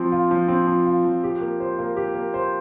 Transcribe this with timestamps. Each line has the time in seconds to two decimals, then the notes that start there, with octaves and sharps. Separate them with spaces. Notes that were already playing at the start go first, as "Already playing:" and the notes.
Already playing: F3 C4
0.12 F4
0.31 F3
0.48 C4
0.67 F3
0.86 F4
1.05 F3
1.23 G4
1.41 A#3
1.60 C5
1.79 A#3
1.96 G4
2.15 A#3
2.34 C5